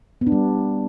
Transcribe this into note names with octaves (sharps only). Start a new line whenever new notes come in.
B3
D4
G3